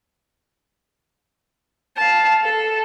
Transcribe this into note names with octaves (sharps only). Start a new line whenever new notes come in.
F5 A5
A4